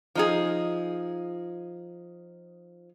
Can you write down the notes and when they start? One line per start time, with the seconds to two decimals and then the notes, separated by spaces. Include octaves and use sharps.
0.15 F3 D#4 G#4